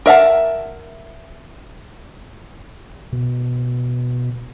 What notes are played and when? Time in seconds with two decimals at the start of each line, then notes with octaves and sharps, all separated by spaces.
0.06 A#4 E5 F#5 A5
3.13 B2